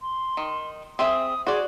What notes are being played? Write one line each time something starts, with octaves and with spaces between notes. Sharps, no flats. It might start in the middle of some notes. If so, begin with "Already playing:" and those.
C6
D#3
C4 G#4 E5 D#6
F#4 G#4 C5 D5